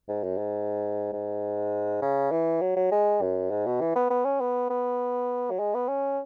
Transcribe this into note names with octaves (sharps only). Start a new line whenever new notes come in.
G#2
F#2
G#2
G#2
C#3
E3
F#3
F#3
G#3
F#2
G#2
B2
E3
B3
B3
C#4
B3
B3
F#3
G#3
B3
C#4